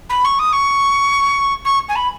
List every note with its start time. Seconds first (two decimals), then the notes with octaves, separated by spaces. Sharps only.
0.10 B5
0.25 C#6
0.39 D#6
0.53 C#6
1.65 C#6
1.89 G#5
1.96 B5